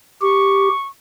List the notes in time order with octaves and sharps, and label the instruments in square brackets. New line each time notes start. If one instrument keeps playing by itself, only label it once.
[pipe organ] G4 [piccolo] C#6